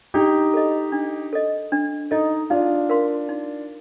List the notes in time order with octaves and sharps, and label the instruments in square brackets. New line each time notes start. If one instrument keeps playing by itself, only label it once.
[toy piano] D4 [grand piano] D#4 G4
[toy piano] A4 D#5
D4
A4 D#5
D4
[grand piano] D#4 [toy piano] A4 D#5
[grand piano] D4 F4 [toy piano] D#4
[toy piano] A#4 F5 C6
D#4